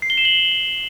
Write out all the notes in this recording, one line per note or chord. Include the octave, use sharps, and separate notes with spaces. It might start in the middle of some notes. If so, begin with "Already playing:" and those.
C7
G7
E7
F#7